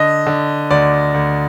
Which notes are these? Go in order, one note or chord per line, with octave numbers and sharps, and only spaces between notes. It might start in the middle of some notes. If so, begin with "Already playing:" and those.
Already playing: D3 D#5
D3
D2 D5
D2